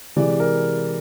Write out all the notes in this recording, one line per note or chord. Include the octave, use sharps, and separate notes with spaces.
C3 E3 G#3 D5
A#4